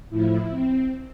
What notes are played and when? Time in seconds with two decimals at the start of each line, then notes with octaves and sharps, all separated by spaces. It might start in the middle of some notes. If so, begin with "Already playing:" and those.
0.10 A2 F3 E4
0.49 C4